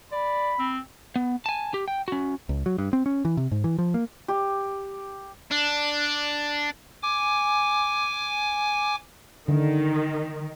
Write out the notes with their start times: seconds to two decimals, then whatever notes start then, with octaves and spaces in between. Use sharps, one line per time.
0.12 D5 B5
0.59 C4
1.16 B3
1.46 G#5 A5
1.74 G4
1.88 G5
2.08 C#4 F#4
2.49 C#2
2.66 F#3
2.78 G2
2.93 C4
3.06 C#4
3.25 E3
3.37 C3
3.51 G#2
3.64 E3
3.78 F3
3.94 A#3
4.28 G4
5.52 D4
7.03 G#5 D6
9.48 D3 D#3